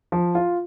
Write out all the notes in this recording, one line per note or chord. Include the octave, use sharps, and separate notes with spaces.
F3
F4